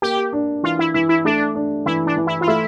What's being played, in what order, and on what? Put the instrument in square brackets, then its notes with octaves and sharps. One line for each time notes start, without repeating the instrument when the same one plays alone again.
[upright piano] A#3 [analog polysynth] G4
[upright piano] D4
[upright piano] E3 [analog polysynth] F4
[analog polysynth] E4
[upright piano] E3 [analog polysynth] E4
[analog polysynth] E4
[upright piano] A3 [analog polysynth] D4
[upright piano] D4
[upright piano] E3 [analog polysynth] E4
[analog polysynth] D4
[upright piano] E3
[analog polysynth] E4
F4
[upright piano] A3 [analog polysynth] E4